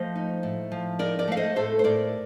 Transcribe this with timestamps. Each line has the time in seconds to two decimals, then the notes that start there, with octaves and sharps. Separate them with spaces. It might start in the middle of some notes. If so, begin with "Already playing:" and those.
Already playing: F3 A3 C5 D#5
0.15 D#4
0.43 A2
0.72 F3
0.99 D#4 A#4 D5
1.19 A#4 D5
1.28 A3 F5
1.37 C5 D#5
1.56 A2 A4 C5
1.79 C5
1.84 A2 A#4 D5